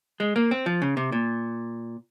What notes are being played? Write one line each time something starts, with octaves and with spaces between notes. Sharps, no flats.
G#3
A#3
C4
F3
C#3
C3
A#2